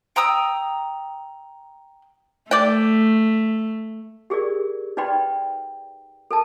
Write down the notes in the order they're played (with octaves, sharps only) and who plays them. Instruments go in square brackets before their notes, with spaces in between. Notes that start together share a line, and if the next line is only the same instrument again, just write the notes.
[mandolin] G5 A#5 D#6 E6
[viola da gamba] A3 [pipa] D5 G5
[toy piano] G4 G#4 A#4 D5
D#4 B4 D5 G5 B5 C6
A4 A#4 A5